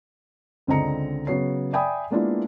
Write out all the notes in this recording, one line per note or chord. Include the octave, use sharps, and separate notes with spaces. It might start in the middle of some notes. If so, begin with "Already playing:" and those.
C#2 D3 C4 D#5 A#5 C#7
C#3 F#3 B3 C#5 C7
D5 E5 G5 G#5 B5 D#6
G#3 A#3 B3 D4 E4 F4